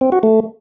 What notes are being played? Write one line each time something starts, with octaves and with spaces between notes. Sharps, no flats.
C4
F#4
A3